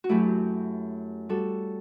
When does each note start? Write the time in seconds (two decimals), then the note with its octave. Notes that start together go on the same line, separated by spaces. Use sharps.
0.04 F#4
0.09 F#2 F#3 A3 E4 G4
1.29 G3 F#4 A4